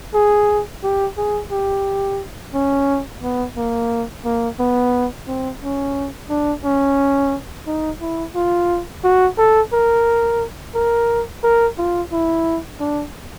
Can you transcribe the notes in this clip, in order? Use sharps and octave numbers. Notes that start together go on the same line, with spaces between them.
G#4
G4
G#4
G4
C#4
B3
A#3
A#3
B3
C4
C#4
D4
C#4
D#4
E4
F4
F#4
A4
A#4
A#4
A#4
F4
E4
D4